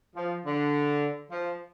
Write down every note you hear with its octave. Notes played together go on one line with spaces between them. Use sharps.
F3
D3
F3